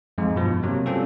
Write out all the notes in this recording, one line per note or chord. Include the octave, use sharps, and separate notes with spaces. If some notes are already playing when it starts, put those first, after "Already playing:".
F2 G#2 G#3
G2 B2 F3
C3 F#3 A#3
G3 C4 C#4 F4 A4